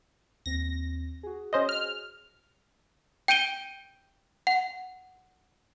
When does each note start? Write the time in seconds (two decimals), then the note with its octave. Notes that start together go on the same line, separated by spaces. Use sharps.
0.46 D#2 C4 A#6
1.23 F#4 G#4
1.53 C#4 C5 D#5
1.69 F6
3.28 G5 G6 D7 D#7 G7
4.47 F#5